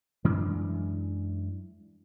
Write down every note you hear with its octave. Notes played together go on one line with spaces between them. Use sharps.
F#2 E3 G#3 D4